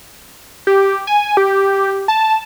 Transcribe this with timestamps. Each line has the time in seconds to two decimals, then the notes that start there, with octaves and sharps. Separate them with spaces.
0.67 G4
1.07 G#5
1.37 G4
2.08 A5